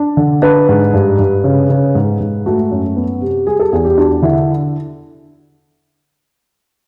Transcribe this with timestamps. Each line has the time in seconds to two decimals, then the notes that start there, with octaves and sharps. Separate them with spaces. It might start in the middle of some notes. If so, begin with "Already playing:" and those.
Already playing: D4
0.17 D3
0.42 D4 B4
0.69 G#2
0.93 G2
1.19 G2
1.44 C#3
1.69 C#3
1.95 G#2
2.20 G#2
2.46 A3 F#4
2.71 F#2
2.96 B3
3.21 C3
3.47 G3 G#4
3.59 A4
3.72 E2 G#4
3.85 G4
3.98 D4 F#4
4.22 D3 E4